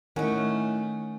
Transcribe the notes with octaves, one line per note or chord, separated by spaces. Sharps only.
A2 D#3 A3 C#4 D#4 A#4 F#5